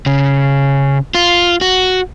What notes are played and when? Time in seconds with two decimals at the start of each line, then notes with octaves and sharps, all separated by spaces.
0.06 C#3
1.15 F4
1.61 F#4